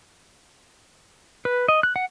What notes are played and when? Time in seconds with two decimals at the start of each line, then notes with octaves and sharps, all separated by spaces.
1.45 B4
1.68 D#5
1.83 F#6
1.96 F#5